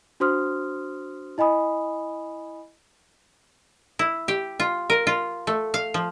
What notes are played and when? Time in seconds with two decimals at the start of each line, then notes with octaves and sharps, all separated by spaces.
0.20 D4 F#4 C5 C6 D#6 F6
1.38 E4 D#5 G#5 B5 D#6
3.99 E4
4.28 G4
4.60 F4
4.90 A#4
5.07 F4
5.47 A3
5.74 F5
5.94 F3